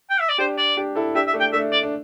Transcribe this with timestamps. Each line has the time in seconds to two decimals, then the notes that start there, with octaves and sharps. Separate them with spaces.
0.10 G5
0.20 E5
0.29 D5
0.38 D4 G4 C5
0.58 D5
0.77 D4 G4
0.95 E4 A4
1.15 D4 G4 E5
1.27 E5
1.33 A3 D4
1.40 G5
1.52 A3 D4 E5
1.72 D5
1.83 D4